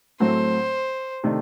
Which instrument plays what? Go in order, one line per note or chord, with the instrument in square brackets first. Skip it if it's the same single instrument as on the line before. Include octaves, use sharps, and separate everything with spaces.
[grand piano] A2 F#3 A3 C4 [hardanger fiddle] C5
[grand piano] C3 D#3 A3 D4